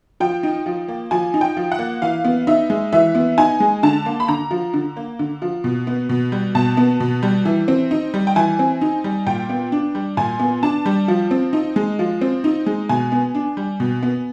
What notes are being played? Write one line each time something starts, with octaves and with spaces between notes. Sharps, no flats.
F3 G5
D#4
F3
A#3
F3 G#5
D#4
G5
F3
F#5
A#3
E3 F5
B3
D#4 E5
G#3
E3 E5
B3
D#4 G#5
G#3
D3 A5
A#3
B5
D3 A#5
F3
D3
A#3
D3
F3
B2
B3
B2
G3
B2 A5
B3
B2
G3
E3
C4
D#4
G3
G5
E3 G#5
C4
D#4
G3
A#2 G5
B3
D4
G3
A#2 G#5
B3
D4 A5
G3
F3
C4
D#4
G#3
F3
C4
D#4
G#3
B2 G#5
B3
D4
G3
B2
B3